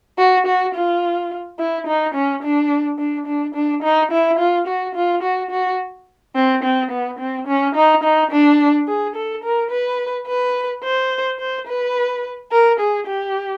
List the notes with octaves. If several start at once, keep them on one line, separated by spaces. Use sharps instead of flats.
F#4
F#4
F4
E4
D#4
C#4
D4
D4
D4
D4
D#4
E4
F4
F#4
F4
F#4
F#4
C4
C4
B3
C4
C#4
D#4
D#4
D4
G#4
A4
A#4
B4
B4
C5
C5
B4
A#4
G#4
G4